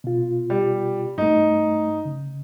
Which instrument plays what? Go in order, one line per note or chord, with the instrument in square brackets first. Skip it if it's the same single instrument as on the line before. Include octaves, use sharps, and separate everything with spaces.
[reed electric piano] B2 F4
[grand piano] G3
[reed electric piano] G2 A3 [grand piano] D#4
[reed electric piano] C#3